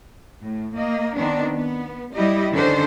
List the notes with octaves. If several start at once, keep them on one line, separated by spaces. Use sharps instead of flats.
A2
A#3 D#5
D#3 B3 C4 D4
B3
G3 E4 G4 D#5
D3 D#3 C#4 D4 A4 C5